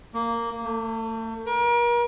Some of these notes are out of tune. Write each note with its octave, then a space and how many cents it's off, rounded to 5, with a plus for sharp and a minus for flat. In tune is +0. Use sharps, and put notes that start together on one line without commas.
A#3 -10
A3 +35
A#4 +40